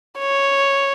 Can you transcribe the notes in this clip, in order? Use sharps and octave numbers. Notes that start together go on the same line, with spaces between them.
C#5